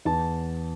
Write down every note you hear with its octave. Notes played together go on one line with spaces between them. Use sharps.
E2 A5